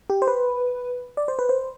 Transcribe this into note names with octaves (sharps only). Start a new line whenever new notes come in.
G4
C5
B4
D5
C5
B4
C5